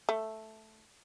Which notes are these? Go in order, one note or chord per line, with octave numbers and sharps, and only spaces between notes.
A3